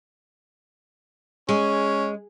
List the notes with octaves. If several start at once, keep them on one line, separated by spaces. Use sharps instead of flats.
G#3 C#4